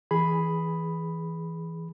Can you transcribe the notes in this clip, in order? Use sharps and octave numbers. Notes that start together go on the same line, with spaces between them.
E3 G#4 B5